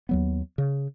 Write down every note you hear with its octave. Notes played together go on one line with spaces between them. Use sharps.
D#2 F#3 B3
C#3